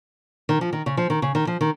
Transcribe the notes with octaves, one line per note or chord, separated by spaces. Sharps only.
D#3
F3
D#3
C#3
F3
D#3
C#3
D#3
F3
D#3